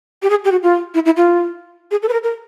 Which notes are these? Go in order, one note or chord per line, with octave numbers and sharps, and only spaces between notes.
G4
G#4
G4
F#4
F4
E4
E4
F4
G#4
A4
B4
A#4
A#4